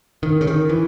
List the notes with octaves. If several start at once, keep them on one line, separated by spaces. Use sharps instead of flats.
D#3
C#3
D#3
E3